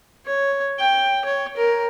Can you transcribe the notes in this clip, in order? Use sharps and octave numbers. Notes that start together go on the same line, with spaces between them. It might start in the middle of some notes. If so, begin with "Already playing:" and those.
C#5
G5
C#5
A#4